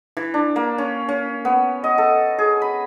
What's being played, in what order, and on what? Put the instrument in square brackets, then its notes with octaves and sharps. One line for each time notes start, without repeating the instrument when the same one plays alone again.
[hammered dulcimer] E3
D4
A#3
C#4
C#4
B3
D#5
A4
G#4
B5